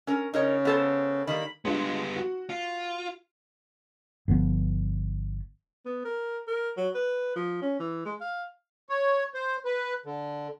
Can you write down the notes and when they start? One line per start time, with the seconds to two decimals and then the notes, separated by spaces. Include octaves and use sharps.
0.07 C#4 A#4
0.34 C#3 D#4 A#4 C#5
0.65 B3 A4 C5
1.27 D#3 G3 A#3 B5
1.65 G3 G#3 B3 D4 F4
2.16 F#4
2.50 F4
4.28 G1 D3 F3 B3
5.86 B3
6.05 A#4
6.48 A#4
6.77 F#3
6.95 B4
7.36 F3
7.62 C#4
7.79 E3
8.05 G#3
8.21 F5
8.89 C#5
9.34 C5
9.65 B4
10.06 D3